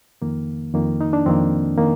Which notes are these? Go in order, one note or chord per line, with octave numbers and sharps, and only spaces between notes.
F2 D#3 A#3
F2 D#3 A#3
D#4
D4
F2 D#3 A#3 C4
D#3 A#3